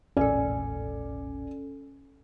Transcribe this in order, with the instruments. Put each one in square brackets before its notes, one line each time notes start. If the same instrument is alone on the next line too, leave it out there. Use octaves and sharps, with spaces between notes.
[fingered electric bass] E1 A#1 A2 [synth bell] C#4 A4 [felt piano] D5 G#5